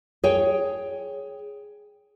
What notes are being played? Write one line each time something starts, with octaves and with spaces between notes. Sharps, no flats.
G#4 C#5 G5